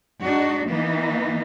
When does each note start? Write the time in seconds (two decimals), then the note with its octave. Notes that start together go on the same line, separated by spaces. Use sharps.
0.21 G#3 D4 D#4 F#4
0.68 E3 A#3 B3 D#4